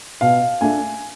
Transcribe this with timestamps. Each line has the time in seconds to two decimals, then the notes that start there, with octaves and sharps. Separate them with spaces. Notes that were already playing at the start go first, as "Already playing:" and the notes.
0.21 B2 F5
0.61 A3 D4 G#5